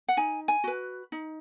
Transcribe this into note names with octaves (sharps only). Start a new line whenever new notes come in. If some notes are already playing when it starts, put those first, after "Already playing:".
F#5
D#4 G#5
G#5
F#4 B4
D#4